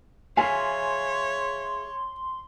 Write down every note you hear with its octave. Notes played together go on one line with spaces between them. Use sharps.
G#4 C#5 E5 F5 G#5 C6